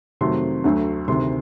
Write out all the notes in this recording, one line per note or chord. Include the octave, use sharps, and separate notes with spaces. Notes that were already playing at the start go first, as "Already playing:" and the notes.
F2 C3 D#3 F#3 A3 C6
D2 D3 F#3 A3
D2 C3 D#3 C6